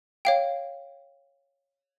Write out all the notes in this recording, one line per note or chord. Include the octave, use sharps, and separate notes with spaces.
C#5 F5 G5